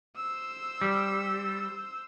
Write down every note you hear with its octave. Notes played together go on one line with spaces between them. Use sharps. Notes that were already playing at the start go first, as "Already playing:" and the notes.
C5 E6
G3